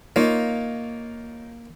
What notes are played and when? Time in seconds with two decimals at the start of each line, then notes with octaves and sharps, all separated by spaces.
0.16 A#3 D#4 F4 C#5